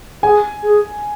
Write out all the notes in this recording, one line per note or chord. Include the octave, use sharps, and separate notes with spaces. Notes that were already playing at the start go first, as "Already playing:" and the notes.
G#4 G#5
G#4